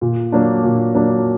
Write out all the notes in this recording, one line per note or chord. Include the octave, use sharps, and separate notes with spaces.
A#2
F#3 A#3 D4
A#2
F#3 A#3 D4